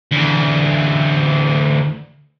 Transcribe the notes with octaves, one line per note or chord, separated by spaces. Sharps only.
D2 E3